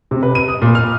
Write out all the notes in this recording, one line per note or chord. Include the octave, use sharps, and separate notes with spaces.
C3
B4
D#7
D#6
A#2
F6